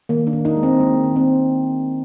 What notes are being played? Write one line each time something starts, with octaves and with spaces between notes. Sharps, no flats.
D#3 A#3
D4
D#3
D#4
G#3
C4
G#3 A#3
D#3
C4